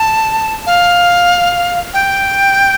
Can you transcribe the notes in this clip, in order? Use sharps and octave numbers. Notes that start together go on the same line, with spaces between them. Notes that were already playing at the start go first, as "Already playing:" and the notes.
Already playing: A5
F5
G5